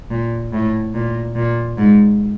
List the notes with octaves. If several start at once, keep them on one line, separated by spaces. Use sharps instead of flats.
A#2
A2
A#2
A#2
G#2